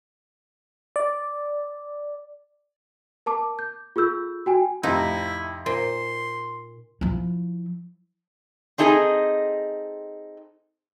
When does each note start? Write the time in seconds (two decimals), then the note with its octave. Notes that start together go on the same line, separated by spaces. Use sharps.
0.96 D5
3.26 A#4 A5 D6
3.59 G6
3.96 F4 G#4 A4 E6 G6
4.46 F#4 G5 G#5
4.83 F2 A2 C3 D#4 E4
5.66 A#2 C5 C6
7.01 F3 E4
8.78 C4 D4 D#4 G#4 A4 D#5